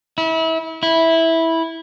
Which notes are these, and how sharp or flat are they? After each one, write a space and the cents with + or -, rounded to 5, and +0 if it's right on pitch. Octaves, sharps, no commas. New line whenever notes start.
E4 -30
E4 -10